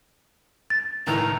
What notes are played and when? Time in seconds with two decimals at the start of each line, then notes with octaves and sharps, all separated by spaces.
0.70 A6
1.07 C#2 A2 D#3 A#5